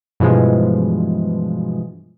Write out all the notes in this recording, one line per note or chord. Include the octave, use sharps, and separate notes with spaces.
G2 B2 E3 F3 G#3